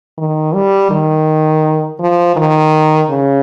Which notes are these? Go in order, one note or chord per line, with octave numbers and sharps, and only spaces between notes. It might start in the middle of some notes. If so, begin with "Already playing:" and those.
D#3
G3
D#3
F3
D#3
C#3